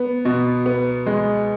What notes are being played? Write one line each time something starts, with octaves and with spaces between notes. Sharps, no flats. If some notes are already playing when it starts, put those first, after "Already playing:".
Already playing: B3
B2
B3
G#3